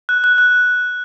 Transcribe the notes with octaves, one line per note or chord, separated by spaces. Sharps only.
F#6
F#6
F#6